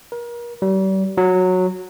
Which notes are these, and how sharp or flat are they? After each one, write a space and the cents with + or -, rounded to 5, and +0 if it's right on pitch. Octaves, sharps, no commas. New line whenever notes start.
A#4 +35
G3 -40
F#3 -10